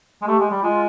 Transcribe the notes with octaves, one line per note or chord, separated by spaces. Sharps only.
G#3
A3 G4
G#3
G3
G#3 F4